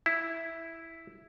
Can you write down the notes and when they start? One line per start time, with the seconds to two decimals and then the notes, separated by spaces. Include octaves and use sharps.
0.06 E4